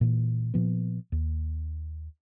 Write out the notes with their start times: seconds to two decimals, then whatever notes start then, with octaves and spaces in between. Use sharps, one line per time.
0.01 A#2 E3
0.54 A#2 F3 B3
1.12 D#2